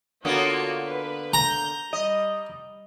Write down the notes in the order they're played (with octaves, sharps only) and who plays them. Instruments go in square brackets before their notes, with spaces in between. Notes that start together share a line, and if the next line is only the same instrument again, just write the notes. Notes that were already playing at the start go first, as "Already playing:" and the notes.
[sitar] D3 A#3 B3 [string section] F4 F#4 C#5
[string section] B4
[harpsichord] A#5 [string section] G6
[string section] G3 [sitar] D#5